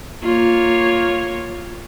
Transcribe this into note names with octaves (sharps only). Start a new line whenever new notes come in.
A#3 F4 C#5